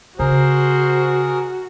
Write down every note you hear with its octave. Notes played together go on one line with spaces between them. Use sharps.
C#3 F#4 G#4 A#4 C5